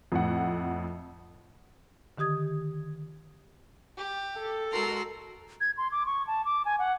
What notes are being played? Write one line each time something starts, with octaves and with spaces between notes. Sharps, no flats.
F2 A2 F#5
D3 D#3 G4 D#6 G#6
G4
A4
G#3 F#4 A#4 A#5 C6
G#6
C6
D6
C#6
A5
D6
G#5
F#5